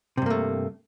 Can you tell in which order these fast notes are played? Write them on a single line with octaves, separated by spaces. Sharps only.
C3 G2 A#3 A3